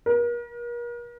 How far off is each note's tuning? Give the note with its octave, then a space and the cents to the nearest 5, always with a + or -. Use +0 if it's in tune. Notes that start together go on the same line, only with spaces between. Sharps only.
A#4 +40